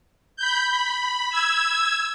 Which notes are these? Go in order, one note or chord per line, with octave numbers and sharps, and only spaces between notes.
B5 G6
B5
E6 G#6